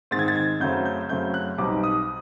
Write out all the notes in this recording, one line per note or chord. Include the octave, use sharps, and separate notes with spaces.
G#2 D#3 G#3 C4 A6
G#6
A6
G#6
F#2 C#3 F#3 A3 C4 G6
G6
F#2 C#3 F#3 A3 C4 G6
F#6
B1 B2 G3 C4 D#4 D6
D#6